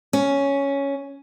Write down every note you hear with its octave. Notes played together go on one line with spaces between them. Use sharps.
C#4